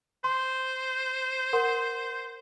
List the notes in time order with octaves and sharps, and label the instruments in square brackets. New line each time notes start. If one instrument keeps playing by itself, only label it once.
[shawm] C5 [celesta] C6
[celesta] A#4 F#5 C6